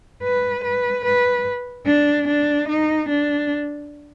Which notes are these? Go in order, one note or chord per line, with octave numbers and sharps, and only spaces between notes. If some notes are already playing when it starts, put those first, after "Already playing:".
B4
B4
B4
D4
D4
D#4
D4